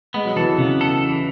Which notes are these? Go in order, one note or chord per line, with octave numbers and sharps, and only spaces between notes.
G#3 B3
F#3
E3 A4
C#3 B3
A4
E3